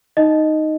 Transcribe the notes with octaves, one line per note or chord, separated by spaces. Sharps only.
D#4 D#5